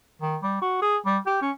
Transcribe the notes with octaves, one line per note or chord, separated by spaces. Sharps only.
D#3
G3
F#4
G#4
G3
G4
C#4